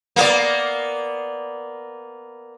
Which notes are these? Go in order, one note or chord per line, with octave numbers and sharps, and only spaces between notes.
A#3 B3 D5